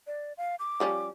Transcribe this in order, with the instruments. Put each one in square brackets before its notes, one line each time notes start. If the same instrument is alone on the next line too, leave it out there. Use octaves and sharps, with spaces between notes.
[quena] D5
F5
D6
[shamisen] F3 G3 C#4